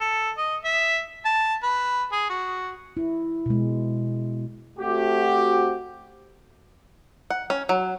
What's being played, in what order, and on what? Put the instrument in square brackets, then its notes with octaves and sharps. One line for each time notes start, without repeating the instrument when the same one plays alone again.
[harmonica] A4
D#5
E5
A5
B4
G#4
F#4
[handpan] E4
B2 G#3
[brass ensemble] A3 C4 F#4 G4
[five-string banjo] F#5
C#4
F#3